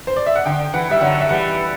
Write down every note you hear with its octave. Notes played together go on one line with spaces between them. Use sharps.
C5
D5
E5
F#5
D3 G5
E3 F#5
G3 E5
D3 F#3 F#5
E5
E3 G3 F#5